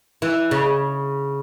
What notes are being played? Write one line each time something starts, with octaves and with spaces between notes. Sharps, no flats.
E3
C#3